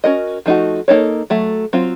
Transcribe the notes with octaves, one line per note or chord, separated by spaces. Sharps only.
C#4 F#4 A#4 D#5
F3 A3 D#4 F#4
A#3 D#4 A4 C#5
F#3 A3
F#3 C4 F4